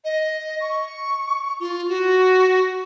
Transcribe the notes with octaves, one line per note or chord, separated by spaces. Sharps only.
D#5
C#6
F4
F#4